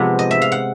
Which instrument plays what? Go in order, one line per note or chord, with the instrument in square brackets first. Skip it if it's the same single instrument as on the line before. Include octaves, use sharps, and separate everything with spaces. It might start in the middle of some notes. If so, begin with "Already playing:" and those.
Already playing: [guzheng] C3 F3 G#3 B3 F#5
D#5
E5
F5
F#5